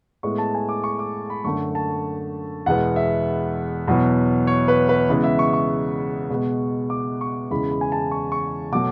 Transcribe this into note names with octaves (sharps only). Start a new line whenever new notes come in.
A2 G#3 B3 C#6
A5
G#5
D6
C#6
D6
B5
F#2 D3 A3 C#6
A5
E2 B2 G#3 B3 F#5
E5
E2 B2 F#3 B3
C#5
B4
B4
C#3 E3 G#3 B3
E5
C#6
C#6
B2 G#3 B3
D6
C#6
E2 C#3 E3 G#3 B5
B5
G#5
A5
C#6
C#6
B2 F#3 A3 D6